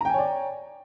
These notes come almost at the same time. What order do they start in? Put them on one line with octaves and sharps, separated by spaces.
A#5 G5 G#5 C#5 D5